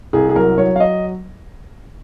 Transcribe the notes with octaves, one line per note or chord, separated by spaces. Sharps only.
C2 G#4
G#4
F#3 A#4
F#3 C#5
F5
D#5